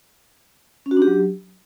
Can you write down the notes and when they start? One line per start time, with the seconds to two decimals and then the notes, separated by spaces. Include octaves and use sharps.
0.86 C#4
0.91 F#4
0.97 D4
1.02 G4
1.07 F#3